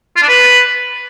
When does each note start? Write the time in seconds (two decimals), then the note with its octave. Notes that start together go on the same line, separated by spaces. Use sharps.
0.16 F4
0.22 D4
0.28 B4